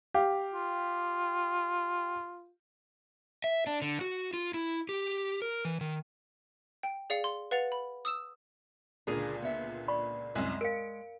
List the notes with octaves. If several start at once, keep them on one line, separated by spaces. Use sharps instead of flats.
G4 F5
F4
E5
D4
D3
F#4
F4
E4
G4
A#4
E3
D#3
G5
G#4 D5 F5 C#7
C6
B4 F5 F#5 A6 C#7 F7
B5
D#6 E6 E7
C#2 A#2 D3 D4 G#4 A#4
B3 E5
D5 B5 C#6
C2 F#2 G#3
A#4 F5 C#7 D7